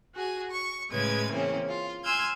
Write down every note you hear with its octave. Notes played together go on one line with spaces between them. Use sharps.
F#4 G#4 G#5
C#6
A2 C#3 G#3 B4 G#6
C#3 E3 A#3 C4 C#4
F4
G#5 C6 E6 F6 G6 G#6